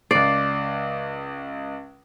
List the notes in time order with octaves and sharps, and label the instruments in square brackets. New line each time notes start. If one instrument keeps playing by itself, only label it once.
[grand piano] C#2 C7 [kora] D5